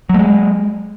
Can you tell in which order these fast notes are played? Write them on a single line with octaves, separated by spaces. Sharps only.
F#3 A3 G#3